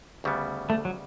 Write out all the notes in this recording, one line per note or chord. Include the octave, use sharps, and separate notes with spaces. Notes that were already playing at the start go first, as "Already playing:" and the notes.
D2 C#3 G3 B3
A3
F#3